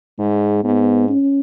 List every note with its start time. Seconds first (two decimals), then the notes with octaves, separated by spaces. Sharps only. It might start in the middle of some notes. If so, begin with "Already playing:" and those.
0.19 G#2 G#3
0.64 G#2 B3
1.09 C#4